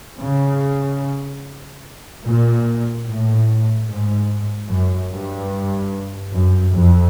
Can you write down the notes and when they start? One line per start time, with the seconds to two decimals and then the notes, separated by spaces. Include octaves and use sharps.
0.19 C#3
2.23 A#2
3.05 A2
3.86 G#2
4.68 F#2
5.09 G2
6.31 F#2
6.72 F2